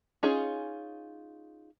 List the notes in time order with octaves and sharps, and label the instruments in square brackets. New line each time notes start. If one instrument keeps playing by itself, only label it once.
[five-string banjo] C#4 D#4 F4 G#4 C#5